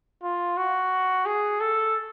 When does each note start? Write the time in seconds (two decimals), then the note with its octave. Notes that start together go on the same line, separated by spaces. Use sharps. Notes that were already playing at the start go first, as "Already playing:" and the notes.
0.23 F4
0.57 F#4
1.26 G#4
1.60 A4